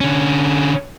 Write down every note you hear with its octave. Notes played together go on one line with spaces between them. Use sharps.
D3 C#4